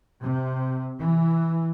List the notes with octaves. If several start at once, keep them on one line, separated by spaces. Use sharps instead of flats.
C3
E3